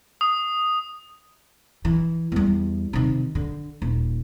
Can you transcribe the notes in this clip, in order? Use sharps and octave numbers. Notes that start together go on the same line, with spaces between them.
D#6
E3
E2 G3
C3 D#3
D3
D#1